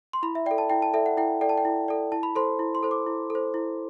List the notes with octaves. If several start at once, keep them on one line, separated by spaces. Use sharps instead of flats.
C6
E4 B5
E5
A4 D5 G5
A5
E4 G5
A5
A4 D5 E5
F#5
E4 G5
A4 D5 G5
A5
G5
E4
A4 D5
E4 A5
B5
A4 C5 C6
E4
C6
A4 C5
D6
E4
A4 C5
E4